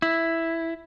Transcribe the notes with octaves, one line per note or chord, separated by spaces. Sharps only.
E4